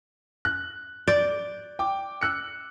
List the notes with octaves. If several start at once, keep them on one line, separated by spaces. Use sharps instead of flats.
F#6
D5 G6
G5 D6
E6 F#6 C#7